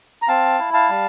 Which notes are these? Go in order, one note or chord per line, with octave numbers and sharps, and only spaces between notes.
A#5
C4 F5 A5
E4
F5 A5
G3